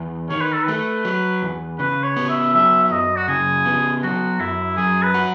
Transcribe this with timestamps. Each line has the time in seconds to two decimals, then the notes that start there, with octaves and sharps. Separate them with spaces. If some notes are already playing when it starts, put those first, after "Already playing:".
Already playing: E2
0.30 D#3 C#5
0.41 B4
0.53 A4
0.63 A3 B4
1.05 F#3
1.42 E2
1.79 C#3 B4
2.04 C#5
2.17 B3
2.29 E5
2.54 F#3 E5
2.84 E5
2.91 F#2 D#5
3.17 F#4
3.28 C#3 G#4
3.65 B3
4.03 F#3 F#4
4.40 F#2 E4
4.77 F#3 G#4
5.03 B4
5.14 F#4